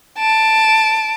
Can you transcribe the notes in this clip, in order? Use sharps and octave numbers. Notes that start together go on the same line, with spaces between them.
A5 D7